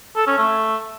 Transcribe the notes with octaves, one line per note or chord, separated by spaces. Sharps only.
A4
C#4
A3